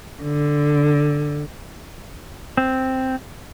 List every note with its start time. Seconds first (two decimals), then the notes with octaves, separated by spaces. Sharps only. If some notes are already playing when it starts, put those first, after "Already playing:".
0.22 D3
2.57 C4